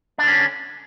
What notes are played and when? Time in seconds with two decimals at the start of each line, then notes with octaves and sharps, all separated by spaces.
0.18 D4
0.23 D3
0.28 C#4